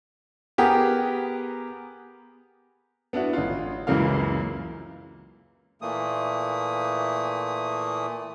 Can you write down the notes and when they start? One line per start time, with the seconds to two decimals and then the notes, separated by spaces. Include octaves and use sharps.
0.58 B3 G4 G#4 A#4
3.13 B3 D4 E4 F#4
3.33 A1 C#4 F4
3.87 C#2 F#2 C#3 E3 A#3 F5
5.82 A#2 E3 A3 A#3 D#6